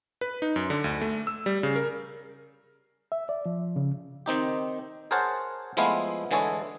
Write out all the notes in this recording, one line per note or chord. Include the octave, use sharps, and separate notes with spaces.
B4
D#4
F#2
D3
D2
A3
E6
G3
C#3
A#4
E5
D5
F3
C#3
D#3 C4 D#4 G4
G#4 A#4 C5 C#5 F#5 A5
F3 G#3 A3 B3 E4 F4
D3 E3 G#3 G#4 A4 C#5